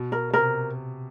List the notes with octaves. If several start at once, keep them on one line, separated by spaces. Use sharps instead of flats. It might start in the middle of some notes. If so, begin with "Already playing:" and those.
Already playing: B2
A#4
C3 A#4